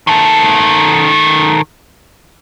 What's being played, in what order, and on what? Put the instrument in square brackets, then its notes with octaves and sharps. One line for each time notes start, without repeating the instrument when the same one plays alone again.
[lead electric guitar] D#3 A4